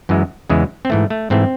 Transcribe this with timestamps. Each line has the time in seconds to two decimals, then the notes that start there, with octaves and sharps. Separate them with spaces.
0.09 F#2 E3 G#3
0.50 E2 C#3 E3 G#3
0.85 C4
0.90 G#2 E3 A3
1.10 A3
1.30 G#2 E3 A3 C4